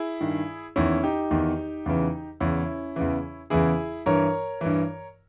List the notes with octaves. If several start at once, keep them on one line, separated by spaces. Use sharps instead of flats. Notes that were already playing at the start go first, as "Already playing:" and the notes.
Already playing: E4 G#4
G2 D#3
E2 D#3 C#4 E4
D#4 G4
E2 D#3
E2 C#3 E3
E2 C#3 E3 C#4 E4
E2 C#3 E3
E2 C#3 E3 E4 G#4
G2 E3 A#4 C#5
G2 E3